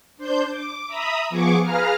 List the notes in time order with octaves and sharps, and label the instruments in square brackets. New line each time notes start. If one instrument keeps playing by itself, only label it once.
[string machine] D4 C5 G6
D6
E5 A#5 B5 D#6
F3 B3 G#4 C#6 D6
G#4 B4 F5 A#5 F6